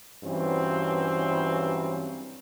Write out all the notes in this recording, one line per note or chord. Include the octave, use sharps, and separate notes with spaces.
G2 E3 F#3 C4 C#4